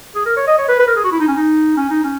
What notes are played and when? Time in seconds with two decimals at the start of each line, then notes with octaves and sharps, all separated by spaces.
0.15 G#4
0.26 A#4
0.37 C#5
0.47 D#5
0.59 C#5
0.69 B4
0.80 B4
0.88 A#4
0.96 G#4
1.04 F#4
1.12 E4
1.20 D#4
1.28 C#4
1.37 D#4
1.77 C#4
1.90 D#4
2.04 C#4